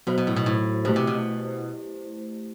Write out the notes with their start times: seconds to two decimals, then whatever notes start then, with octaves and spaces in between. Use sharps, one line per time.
0.07 B2 F#3 B3 F#4 C5
0.18 B2
0.27 A2
0.36 B2
0.46 A2
0.85 B2 A3 E4 G4 C5
0.96 C3
1.07 B2